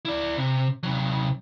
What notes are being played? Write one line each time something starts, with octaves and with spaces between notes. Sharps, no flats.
E4 D5
C3
C3 F#3